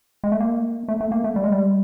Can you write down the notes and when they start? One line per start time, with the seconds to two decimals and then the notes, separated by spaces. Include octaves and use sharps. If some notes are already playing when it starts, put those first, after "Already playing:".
0.24 G#3
0.32 A3
0.40 A#3
0.88 A3
1.01 A3
1.12 A#3
1.24 A3
1.36 G3
1.44 G#3
1.52 G3